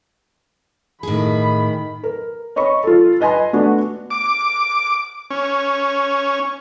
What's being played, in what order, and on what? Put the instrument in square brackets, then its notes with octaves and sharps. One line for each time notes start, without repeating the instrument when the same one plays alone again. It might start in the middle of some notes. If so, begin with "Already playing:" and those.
[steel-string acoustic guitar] A2 G#4 [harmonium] D#3 [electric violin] B5
[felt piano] A#4
C#5 D#5 B5 C#6
F4 A4
B4 D#5 G#5 B5 C6
A3 B3 D4 F#4
[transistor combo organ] D6
C#4